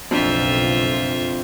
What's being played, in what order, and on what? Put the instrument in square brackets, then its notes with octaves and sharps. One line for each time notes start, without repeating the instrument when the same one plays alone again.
[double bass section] F#1 B1 [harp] F2 C4 D4 [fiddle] F4 E5